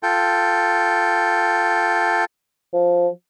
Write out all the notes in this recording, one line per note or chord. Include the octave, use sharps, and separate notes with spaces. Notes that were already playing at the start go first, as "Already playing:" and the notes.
F4 A4 G5
F3